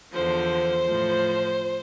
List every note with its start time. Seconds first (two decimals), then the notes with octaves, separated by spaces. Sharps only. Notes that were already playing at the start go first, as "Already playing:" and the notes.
0.13 E2 D3 F3 C5
0.84 A2 F3